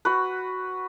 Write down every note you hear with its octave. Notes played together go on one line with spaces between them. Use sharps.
F#4 B4